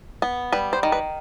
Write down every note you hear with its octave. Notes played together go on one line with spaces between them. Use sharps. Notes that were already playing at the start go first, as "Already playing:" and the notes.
B3
G3 B4
C5
D#3
B4